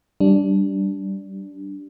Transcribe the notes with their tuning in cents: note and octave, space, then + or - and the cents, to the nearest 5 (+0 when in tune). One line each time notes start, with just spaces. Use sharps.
G3 -10 D4 -10